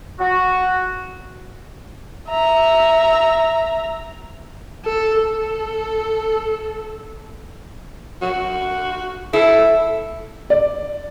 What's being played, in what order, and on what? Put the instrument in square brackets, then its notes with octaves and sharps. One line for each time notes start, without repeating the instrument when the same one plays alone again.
[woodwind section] F#4
[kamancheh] E5 A#5
[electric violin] A4
A4
[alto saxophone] F#4
[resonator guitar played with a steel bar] E4 [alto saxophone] A4
[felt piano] D5